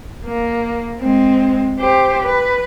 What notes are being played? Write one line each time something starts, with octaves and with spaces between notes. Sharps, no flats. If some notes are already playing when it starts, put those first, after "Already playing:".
A#3
G#3 C4
G4 C5
B4